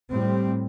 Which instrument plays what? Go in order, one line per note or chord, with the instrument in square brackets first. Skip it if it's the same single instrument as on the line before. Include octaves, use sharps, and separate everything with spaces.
[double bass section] A2 G3 C4